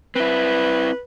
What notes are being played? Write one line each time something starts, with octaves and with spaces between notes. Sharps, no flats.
C4 E4 B4